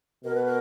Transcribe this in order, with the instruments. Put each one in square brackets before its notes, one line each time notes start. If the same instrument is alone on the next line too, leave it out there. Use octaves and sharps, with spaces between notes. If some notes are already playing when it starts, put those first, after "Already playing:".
[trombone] B2 [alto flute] A#4
[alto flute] B4
A#4